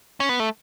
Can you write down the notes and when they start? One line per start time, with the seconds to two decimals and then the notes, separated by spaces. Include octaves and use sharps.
0.20 C#4
0.29 B3
0.40 A3